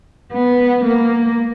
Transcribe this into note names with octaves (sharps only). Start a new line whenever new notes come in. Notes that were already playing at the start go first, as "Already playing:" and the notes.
B3
A#3